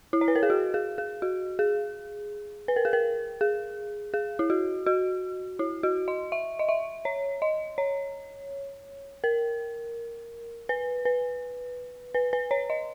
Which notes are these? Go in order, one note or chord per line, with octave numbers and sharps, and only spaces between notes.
E4
C#5
B4
A#4
G#4
F#4
G#4
G#4
F#4
G#4
B4
A#4
G#4
A#4
G#4
G#4
E4
F#4
F#4
E4
F#4
D#5
E5
D#5
E5
C#5
D#5
C#5
A#4
B4
B4
B4
B4
C#5
D#5